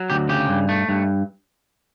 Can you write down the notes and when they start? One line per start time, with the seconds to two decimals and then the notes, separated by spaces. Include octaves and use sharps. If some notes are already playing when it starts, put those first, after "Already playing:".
Already playing: F#3
0.10 D2 G4
0.29 C#3 G4
0.49 G2
0.69 A3
0.89 G2